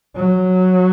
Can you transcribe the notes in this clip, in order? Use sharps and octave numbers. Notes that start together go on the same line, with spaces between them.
F#3